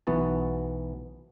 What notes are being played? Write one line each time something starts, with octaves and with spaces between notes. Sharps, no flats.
B1 E3 B3 F#4 A5